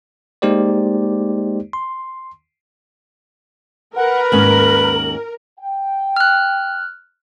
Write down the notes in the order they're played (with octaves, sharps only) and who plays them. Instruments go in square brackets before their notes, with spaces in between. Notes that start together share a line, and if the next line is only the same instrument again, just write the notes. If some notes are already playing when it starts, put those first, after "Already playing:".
[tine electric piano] G#3 A#3 D#4 G4 C5 D5
C6
[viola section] A#4 [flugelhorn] B4 [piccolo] F#5
[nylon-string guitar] D#2 G#2 C#4 [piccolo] F#7
[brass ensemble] G5
[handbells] F6 F#6